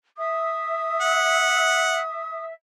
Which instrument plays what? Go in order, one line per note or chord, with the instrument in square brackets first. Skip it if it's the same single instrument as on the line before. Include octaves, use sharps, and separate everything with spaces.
[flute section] E5 [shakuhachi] D#6
[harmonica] F#5